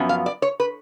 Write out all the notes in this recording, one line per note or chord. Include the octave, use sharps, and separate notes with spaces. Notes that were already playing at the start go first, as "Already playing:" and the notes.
Already playing: F#2 F3 B3
F5
D5
C#5
B4